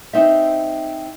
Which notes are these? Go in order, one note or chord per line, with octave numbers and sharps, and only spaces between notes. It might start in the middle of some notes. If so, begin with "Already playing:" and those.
C4 D#4 C5 E5